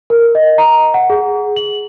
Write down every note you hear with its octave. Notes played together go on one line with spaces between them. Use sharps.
A#4
D#5
A#5
F#5
G#4
F#7